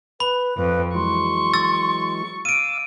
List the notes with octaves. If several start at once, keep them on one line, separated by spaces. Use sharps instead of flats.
B4 B5
F2 B4
E3 F#3 G#3 C6 C#6
E6 A6
F5 D6 E6 D7 D#7